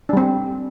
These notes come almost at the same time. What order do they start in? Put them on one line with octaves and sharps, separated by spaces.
D4 G3 C4